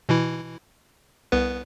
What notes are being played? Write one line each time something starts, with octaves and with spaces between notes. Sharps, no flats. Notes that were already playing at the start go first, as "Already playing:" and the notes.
B2 E3 E4
C2 B3 B4